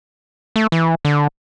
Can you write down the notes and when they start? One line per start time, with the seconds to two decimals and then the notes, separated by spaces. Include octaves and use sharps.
0.56 A3
0.72 E3
1.05 D3